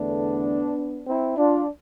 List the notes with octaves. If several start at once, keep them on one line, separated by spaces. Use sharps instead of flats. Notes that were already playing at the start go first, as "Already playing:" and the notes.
Already playing: E2 D3 A3 B3 D4
C4 E4
D4 F4